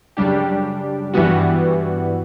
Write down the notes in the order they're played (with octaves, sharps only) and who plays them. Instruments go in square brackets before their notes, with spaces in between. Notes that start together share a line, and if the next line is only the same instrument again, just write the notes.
[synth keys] F#2 C#3 G3 D4 G4
G2 E3 G3 B3 F#4